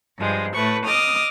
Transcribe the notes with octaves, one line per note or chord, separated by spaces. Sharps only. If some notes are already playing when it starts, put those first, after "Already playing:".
G2 F3 G#3
A2 A3 B4 C#6
D#5 D6 D#6 F6